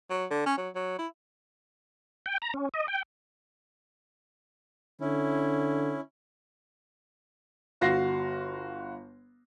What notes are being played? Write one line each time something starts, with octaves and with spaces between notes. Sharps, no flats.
F#3
D3
C#4
F#3
F#3
E4
G5
A#5
C#4
D#5
G5
D3 C#4 E4
G1 F#4 F5 C6 A#6 C7